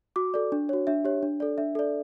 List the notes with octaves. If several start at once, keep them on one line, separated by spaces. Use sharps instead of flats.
F#4 D6
A4 D5
D4
F#4 C#5
D4 E5
G4 C#5
D4
A4 D5
D4 E5
A4 D5